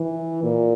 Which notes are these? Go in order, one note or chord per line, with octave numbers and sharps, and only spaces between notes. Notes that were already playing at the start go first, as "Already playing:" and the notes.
Already playing: E3
A#2